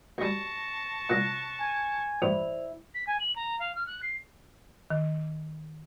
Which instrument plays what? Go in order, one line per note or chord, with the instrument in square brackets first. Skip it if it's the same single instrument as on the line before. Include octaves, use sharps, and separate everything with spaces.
[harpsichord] D2 G3 [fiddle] A5 C#6 [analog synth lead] A#6
[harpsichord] C2 A#2 [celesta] F#6 A#6
[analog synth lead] G#5
[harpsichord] A1 G2 [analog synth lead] E4 [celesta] C5 D5 F7
[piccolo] B6
G#5
F#7
A#5
F5
F6
F#6
C7
[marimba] D#3